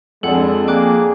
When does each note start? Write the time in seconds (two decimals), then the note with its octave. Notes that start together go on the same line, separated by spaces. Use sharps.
0.23 F2 G#3 D4 A4 F#5
0.68 A#3 G#4 G5 D6 F#6